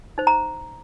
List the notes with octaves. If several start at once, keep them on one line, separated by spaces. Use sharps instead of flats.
D#4 C5
A#5